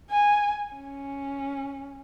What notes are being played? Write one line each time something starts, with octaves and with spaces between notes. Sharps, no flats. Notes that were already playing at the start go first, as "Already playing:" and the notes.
G#5
C#4